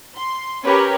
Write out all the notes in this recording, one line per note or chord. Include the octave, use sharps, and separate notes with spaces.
C6
C#4 G4 A#4 B4 C#5